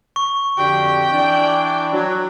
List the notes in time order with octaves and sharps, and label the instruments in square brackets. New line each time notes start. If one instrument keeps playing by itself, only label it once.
[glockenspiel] C#6
[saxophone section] F2 D3 [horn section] D4 F#4 G4 [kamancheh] G5
[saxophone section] E3 D4 [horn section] D5
[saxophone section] F#3